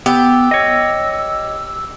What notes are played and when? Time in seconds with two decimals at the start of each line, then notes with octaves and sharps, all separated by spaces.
0.06 B3 G4 E6
0.51 C#5 D#5